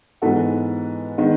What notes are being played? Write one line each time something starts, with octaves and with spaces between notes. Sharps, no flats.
G#2 E3 B3 F#4 A4
D#3 G#3 B3 D#4